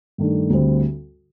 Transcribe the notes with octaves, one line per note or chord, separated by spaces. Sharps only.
G2 D#3 A3 D4
D2 D3 G3 C4